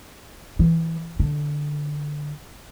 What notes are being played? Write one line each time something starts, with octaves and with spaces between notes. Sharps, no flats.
E3
D3